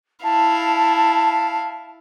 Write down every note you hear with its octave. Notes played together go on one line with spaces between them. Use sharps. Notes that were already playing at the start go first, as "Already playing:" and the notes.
E4 F5 A5